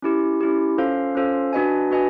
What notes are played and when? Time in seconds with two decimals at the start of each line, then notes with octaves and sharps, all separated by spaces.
0.02 C#4 E4 G4
0.41 C#4 E4 G4
0.78 C#4 F4 A4 C5 F5
1.15 C#4 F4 A4 C5 F5
1.53 D4 F#4 B4 D#5 G#5
1.91 D4 F#4 B4 D#5 G#5